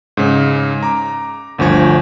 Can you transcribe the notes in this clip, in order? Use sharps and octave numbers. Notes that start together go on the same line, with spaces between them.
G#2 C#3
A#5 D6
G1 D2 F3 C#6 G#6